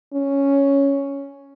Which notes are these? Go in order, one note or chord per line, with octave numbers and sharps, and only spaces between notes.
C#4